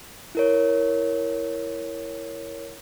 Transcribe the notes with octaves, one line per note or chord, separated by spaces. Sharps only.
E4 A#4 C#5